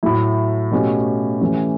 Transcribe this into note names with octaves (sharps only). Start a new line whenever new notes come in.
A2 F#3 A3 E4
B2 A3 C#4 G4
E3 A3 C#4 G4